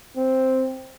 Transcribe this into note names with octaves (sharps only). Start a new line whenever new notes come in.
C4